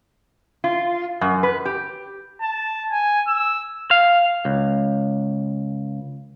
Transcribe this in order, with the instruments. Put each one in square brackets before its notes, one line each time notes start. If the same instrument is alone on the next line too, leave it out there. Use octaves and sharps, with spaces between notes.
[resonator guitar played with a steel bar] F4
F#2
B4
G4
[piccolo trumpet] A5
G#5
E6
[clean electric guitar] F5
C#2